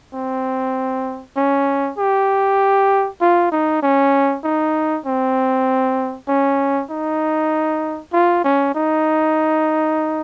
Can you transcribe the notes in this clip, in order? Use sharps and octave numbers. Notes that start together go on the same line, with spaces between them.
C4
C#4
G4
F4
D#4
C#4
D#4
C4
C#4
D#4
F4
C#4
D#4